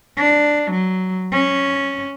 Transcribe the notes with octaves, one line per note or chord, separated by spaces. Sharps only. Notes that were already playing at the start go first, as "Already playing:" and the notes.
D4
F#3
C#4